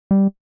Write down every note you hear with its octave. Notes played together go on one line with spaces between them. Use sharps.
G3